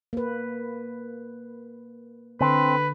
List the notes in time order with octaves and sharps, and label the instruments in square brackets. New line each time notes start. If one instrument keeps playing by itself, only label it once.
[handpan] A#3 B4
[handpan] D3 [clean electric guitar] C4 [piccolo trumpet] B4